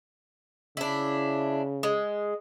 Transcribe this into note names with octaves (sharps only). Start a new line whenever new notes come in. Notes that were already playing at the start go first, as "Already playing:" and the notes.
C#3 D4 E4
G#3